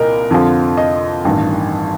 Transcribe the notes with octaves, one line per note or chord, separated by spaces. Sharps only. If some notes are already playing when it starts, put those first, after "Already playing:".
Already playing: C2 A#2 A#4 D#5
F2 D3 F3
D#5
A1 G2 D#3